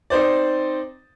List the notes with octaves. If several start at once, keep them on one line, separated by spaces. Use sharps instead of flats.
C4 D#4 C5 D5